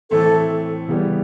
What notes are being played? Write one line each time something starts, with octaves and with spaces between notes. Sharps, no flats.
A2 E3 A3 C4 A4
C#3 E3 G3 B3